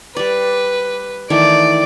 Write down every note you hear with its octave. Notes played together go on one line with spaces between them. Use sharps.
G3 B4 D5
D#3 E3 A3 D5